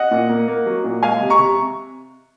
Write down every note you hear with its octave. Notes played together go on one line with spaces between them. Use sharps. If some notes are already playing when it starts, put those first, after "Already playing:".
Already playing: D#5 F#5
A#2
A#3
A#3
F#3
A#2
G#3 F5 G#5
C3
A#5 C#6
C3